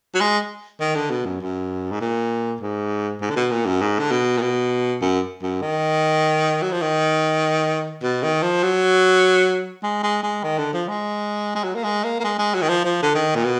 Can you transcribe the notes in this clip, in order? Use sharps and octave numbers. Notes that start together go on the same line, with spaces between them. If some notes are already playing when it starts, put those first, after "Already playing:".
F#3
G#3
D#3
D3
B2
F#2
F#2
G#2
A#2
G#2
G#2
D3
B2
A#2
F#2
G#2
D3
B2
A#2
B2
F#2
F#2
D#3
F#3
F3
D#3
B2
D#3
F3
F#3
G#3
G#3
G#3
D#3
D3
F3
G#3
G#3
F#3
A#3
G#3
A#3
A#3
G#3
G#3
F#3
D#3
F3
F3
D3
D#3
A#2
B2